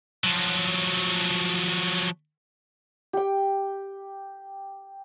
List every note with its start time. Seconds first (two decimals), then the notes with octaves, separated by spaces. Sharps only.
0.24 F3 F#3
3.13 G4 G5